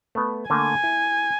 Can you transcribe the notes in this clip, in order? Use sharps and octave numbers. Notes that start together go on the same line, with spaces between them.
A3 B3
D3 A3 A#3 G#5
E4